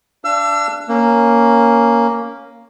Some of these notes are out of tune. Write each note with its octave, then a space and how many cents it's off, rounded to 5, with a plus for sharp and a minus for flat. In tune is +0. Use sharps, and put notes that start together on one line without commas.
D4 -5 F5 -35 E6 +35
A#3 +0 C#4 +0